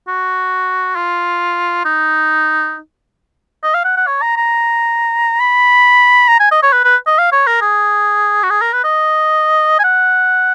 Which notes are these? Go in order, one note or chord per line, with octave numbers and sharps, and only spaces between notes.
F#4
F4
D#4
D#5
F5
F#5
F#5
C#5
A#5
A#5
B5
A#5
G#5
D#5
C#5
B4
B4
D#5
F5
C#5
A#4
G#4
F#4
G#4
A#4
B4
D#5
G#5
F#5